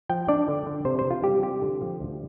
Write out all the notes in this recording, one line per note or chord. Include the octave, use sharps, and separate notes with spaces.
F3 G5
D4 D5
D3
D3
C3 C5
C5
C3
F4
G3 G4
C3 G4
D3
F3
D2